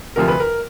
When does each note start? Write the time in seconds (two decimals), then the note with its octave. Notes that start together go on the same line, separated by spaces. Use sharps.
0.16 D2 C3 F3 A#4
0.28 B4
0.40 A#4